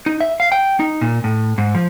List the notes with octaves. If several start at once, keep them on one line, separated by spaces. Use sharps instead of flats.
D#4
E5
F5
G5
D#4
A#2
A2
G#2
F3